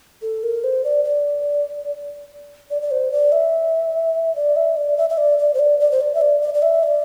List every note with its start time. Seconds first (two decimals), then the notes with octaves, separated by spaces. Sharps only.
0.22 A4
0.43 A#4
0.64 C5
0.84 D5
1.05 D5
2.70 D5
2.82 D5
2.91 C5
3.12 D5
3.32 E5
4.36 D5
4.56 E5
4.77 D5
4.97 E5
5.10 E5
5.18 D5
5.39 D5
5.54 C5
5.59 D5
5.80 D5
5.91 C5
6.01 D5
6.15 E5
6.21 D5
6.42 D5
6.54 D5
6.62 E5
6.83 D5